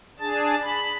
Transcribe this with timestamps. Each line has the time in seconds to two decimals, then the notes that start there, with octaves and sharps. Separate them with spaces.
0.19 D4 G#4 A5 A6
0.61 B5